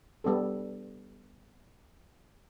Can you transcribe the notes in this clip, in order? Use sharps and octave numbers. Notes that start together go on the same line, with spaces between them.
G3 B3 D4 A4